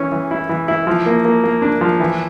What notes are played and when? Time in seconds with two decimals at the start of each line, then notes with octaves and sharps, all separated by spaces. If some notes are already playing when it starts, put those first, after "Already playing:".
Already playing: E3 C#4
0.12 E3
0.31 E4
0.49 E3
0.68 E4
0.87 F3
1.06 A#3
1.25 A#3
1.44 A#3
1.62 D4
1.81 F3
2.00 E3